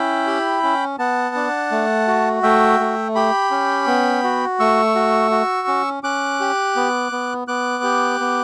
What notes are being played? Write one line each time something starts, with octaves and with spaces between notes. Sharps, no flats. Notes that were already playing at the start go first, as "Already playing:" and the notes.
Already playing: C#4 E4 G5 B5
G4
C#4
B3 F#5 A5
D4
A3
F#4
A3 E5 G5
A3
G4 G5 B5
C#4
B3
F#4
A3 C#6 E6
F#4
F#4
C#4
C#4 D6 F#6
G4
B3
B3
B3 D6 F#6
G4
B3